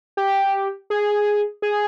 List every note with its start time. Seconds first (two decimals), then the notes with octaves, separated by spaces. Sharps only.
0.17 G4
0.90 G#4
1.62 G#4